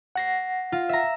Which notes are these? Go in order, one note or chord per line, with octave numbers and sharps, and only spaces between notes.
F#5 A#6 C7
F4
E5 A#5